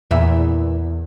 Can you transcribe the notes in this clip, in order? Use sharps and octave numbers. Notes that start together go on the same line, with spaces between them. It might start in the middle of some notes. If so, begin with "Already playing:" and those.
E2 A#2 E3 E5